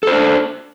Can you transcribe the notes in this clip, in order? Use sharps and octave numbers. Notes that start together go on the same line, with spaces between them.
D4 A4 C5